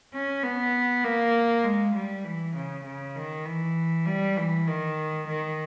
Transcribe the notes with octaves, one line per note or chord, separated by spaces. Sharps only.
C#4
B3
A#3
G#3
G3
E3
C#3
C#3
D#3
E3
G3
E3
D#3
D#3